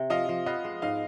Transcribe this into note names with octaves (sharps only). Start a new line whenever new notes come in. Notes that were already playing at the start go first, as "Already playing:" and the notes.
Already playing: C3
F3 D#5 F5
F3
B3 D#5 F5
G#3
G#2 D#5 F5